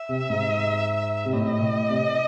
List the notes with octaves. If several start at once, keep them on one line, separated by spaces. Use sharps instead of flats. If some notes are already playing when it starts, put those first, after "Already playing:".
Already playing: E5
C3
G#2
C3
A2 D#5
A2
C3